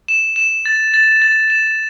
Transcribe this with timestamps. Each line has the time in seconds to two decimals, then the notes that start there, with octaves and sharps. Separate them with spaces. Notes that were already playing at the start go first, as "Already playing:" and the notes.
0.08 E7
0.36 E7
0.66 A6
0.94 A6
1.22 A6
1.50 E7